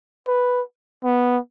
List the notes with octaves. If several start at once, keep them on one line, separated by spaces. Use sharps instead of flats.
B4
B3